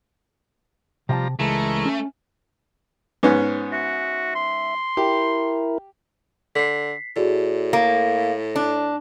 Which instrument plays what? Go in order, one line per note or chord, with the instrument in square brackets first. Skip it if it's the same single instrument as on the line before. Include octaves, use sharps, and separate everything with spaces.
[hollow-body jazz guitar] C3 F5 A5 [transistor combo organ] F3 G3 A#5
[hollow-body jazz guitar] C#2 [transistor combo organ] E3 G#3 A#4 [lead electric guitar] A3
[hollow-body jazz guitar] C#4
[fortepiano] G#2 B3 C#4
[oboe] F#4 [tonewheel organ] E5
[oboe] C6
[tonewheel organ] E4 A#4 [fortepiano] G4
[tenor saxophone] D3 [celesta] B6 C7
[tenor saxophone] A2 [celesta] F#4 G#4 D5
[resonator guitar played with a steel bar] A#3 [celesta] A#6
[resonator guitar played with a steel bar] D4